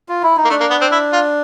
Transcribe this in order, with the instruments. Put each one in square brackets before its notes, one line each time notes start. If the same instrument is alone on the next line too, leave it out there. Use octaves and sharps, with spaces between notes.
[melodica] F4
E4
D#4
[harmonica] A#3
[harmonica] A3 [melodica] D4
[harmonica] A#3
B3
C4
E4
F4